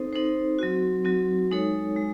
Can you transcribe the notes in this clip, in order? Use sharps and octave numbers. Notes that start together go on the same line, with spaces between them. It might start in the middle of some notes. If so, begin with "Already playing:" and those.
Already playing: C4 D#4 A4 C5
C4 D#4 A4 C5
F#3 C4 F#4
F#3 C4 F#4
G#3 D#4 A4 C#5
G#3